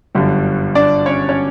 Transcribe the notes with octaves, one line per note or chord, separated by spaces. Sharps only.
G1 F#2 D3 G3
D4 D5
C#4 C#5
C#4 C#5